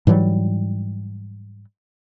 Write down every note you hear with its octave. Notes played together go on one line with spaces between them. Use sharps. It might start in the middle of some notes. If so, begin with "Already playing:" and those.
G#2 E3 F#3 G3